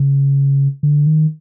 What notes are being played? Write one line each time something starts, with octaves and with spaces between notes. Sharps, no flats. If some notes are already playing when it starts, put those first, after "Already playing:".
Already playing: C#3
D3
D#3